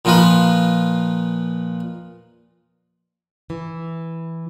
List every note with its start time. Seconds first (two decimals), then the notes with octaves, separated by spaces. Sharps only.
0.05 A#2 F3 D#4 F4 B4
3.50 E3